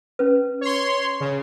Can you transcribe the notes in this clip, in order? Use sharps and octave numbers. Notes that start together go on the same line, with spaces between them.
C#4 B4
C#5 C6
C#3